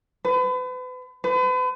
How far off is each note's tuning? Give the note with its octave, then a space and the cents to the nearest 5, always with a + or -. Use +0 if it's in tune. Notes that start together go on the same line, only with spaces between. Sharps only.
B4 +35
B4 +40